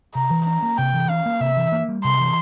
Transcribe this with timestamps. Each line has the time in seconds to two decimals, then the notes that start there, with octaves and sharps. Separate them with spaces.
0.15 C3 A#5
0.30 E3
0.46 C#4 A#5
0.62 A#3
0.77 C3 G5
0.93 E3
1.09 C#4 F5
1.26 A#3
1.40 C3 E5
1.57 E3
1.72 A#3
1.89 G3
2.04 C3 C6
2.20 E3